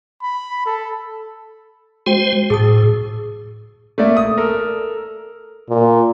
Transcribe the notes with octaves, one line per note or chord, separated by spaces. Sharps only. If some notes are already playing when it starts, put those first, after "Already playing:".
B5
A4
G#3 F#4 C5 G5
A2 G#4 A5 D#6
A3 A#3 D5 E5
D#6
A4 A#4
A#2